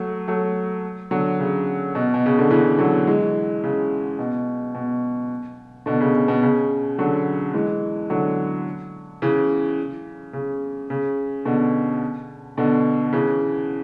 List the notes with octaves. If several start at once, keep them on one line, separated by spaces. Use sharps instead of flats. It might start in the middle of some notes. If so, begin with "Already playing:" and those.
Already playing: F#3 A3
F#3 A3
D3 F#3
C#3
B2
B2
C#3
D3
C#3 E3
D3 F#3
E3 G#3
C#3
B2
B2
B2 D3
C#3
C#3
B2
C#3
D3 F#3
E3 G#3
D3 F#3
C#3 E3
C#3
C#3
B2 D3
B2 D3
C#3 E3